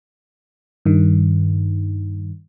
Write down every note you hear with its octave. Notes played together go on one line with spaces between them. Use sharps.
G2 D#3